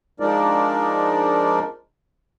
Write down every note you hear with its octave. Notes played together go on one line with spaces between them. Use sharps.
F3 G#3 D4 D#4 A#4 D5